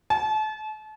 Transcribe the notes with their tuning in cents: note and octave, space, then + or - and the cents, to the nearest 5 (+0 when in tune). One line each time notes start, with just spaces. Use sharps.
A5 -35